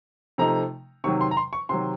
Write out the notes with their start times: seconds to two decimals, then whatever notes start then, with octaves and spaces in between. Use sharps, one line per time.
0.38 C3 F3 A3 D#4 A#5
1.04 C3 D#3 F#3 C#6
1.21 C6
1.31 A#5
1.37 C6
1.53 C#6
1.69 C3 D#3 F#3 C6